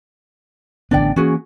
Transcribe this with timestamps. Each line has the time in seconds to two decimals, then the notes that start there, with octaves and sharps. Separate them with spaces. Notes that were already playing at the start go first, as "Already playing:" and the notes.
0.91 A1 D3 B3 D4 D5 G5
1.16 E3 A#3 C#4 F#4 G#4